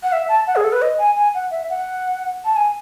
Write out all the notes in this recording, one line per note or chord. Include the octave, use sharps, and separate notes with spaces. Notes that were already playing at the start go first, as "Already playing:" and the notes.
F#5
E5
A5
F#5
G#4
A4
B4
D#5
G#5
G#5
F#5
E5
F#5
A5
G#5